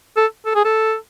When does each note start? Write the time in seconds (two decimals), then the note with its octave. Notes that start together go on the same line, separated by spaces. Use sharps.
0.17 A4
0.46 A4
0.55 G#4
0.65 A4